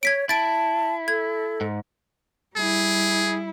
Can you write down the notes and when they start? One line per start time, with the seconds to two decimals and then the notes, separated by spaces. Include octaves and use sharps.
0.03 C#5 G#6 B6 D7
0.29 E4 A5 A6 D7
1.08 A4 G#6
1.61 G#2
2.56 G3 E4 G#4